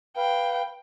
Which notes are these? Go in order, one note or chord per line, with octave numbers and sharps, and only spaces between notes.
B4 F5 G5